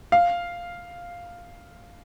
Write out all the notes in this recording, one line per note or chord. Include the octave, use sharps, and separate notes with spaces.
F5